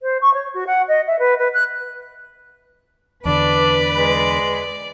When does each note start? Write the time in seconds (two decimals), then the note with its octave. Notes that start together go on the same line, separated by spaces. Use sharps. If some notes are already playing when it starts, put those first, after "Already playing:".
0.02 C5
0.21 C#6
0.34 C#5
0.54 F#4
0.67 F#5
0.88 D#5
1.07 E5
1.19 B4
1.39 B4
1.54 F#6
3.25 E2 D3 D4 B4 D5
3.96 G#3